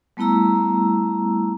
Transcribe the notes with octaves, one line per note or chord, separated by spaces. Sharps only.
G3 A3 B3 E4 A#5 E6